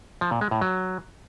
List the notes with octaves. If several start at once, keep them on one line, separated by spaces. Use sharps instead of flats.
F3
A#2
G#3
A2
F#3